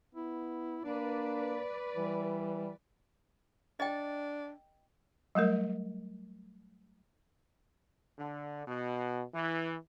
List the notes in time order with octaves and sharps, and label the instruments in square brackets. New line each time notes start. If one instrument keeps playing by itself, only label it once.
[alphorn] B3 [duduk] E4
[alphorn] A#3 [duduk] D4 [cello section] B4 D5
[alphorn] E3 [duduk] G3
[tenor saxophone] D4 [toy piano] D#5 G5
[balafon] F#3 G3 A3 A#4
[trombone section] D3
B2
E3